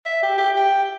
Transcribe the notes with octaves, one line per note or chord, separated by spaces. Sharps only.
E5
G4
G4
G5